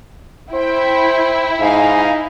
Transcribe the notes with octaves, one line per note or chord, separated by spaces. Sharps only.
E4 C5 G5
G#2 D#4 F5 G#5